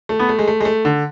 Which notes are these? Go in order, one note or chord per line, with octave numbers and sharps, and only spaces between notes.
A3
B3
A3
G#3
A3
G#3
A3
D3